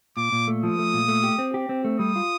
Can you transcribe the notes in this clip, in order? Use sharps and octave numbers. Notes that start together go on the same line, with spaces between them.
A#2 D6
A#2
A3
F3 D#6
A3
A#2
A3
G4
C4
G4
C4
A3
G3 D#6
F4